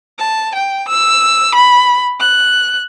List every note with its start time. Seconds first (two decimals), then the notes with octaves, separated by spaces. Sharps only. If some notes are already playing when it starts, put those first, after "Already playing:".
0.19 A5
0.55 G5
0.88 E6
1.55 B5
2.20 F#6